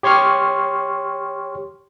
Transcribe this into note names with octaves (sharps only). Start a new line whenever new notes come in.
G4 C#5 C6 C#6 F6